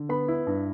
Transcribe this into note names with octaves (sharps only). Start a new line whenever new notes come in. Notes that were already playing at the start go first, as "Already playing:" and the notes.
Already playing: D3
B3 B5
E4
G2